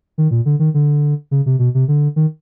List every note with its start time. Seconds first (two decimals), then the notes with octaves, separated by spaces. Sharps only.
0.18 D#3
0.31 A#2
0.45 D3
0.59 D#3
0.74 D3
1.31 C#3
1.46 C3
1.59 B2
1.74 C3
1.88 D3
2.16 D#3